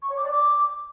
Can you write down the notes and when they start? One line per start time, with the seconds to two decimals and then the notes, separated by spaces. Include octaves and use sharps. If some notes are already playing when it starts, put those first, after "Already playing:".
0.02 C#6
0.10 C#5
0.17 D6
0.24 D5
0.32 D6